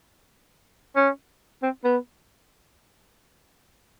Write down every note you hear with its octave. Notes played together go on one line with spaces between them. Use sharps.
C#4
C4
B3